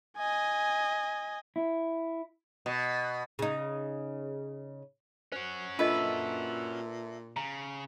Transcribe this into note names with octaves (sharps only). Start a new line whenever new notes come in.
D#5 G#5
E4
B2
C#3 D#4
C#4 F#4 C5
A#2 D4 F4 A4 B4 D#5 E5
C#3 A#5